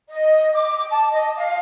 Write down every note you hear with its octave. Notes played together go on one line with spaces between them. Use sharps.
D#5
D6
A5
D#5
F5